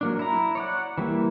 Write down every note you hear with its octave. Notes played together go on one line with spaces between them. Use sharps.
F#3 A#3 D4
E4 A#5
C#5 D5 F#5
E3 G3 A#3 E4